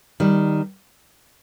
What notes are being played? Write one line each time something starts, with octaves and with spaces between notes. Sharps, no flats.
D#3 G3